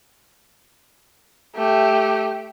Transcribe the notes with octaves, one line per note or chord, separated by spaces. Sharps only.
A3 G4